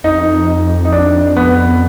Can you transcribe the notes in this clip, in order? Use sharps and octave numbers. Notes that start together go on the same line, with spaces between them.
F2 D#4
D#4
D4
B3